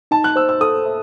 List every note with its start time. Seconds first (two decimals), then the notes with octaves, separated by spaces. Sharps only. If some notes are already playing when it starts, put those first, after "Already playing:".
0.11 D#4 A5
0.24 F#6
0.36 C5 E6
0.49 E6
0.61 A4 D#6
0.86 E5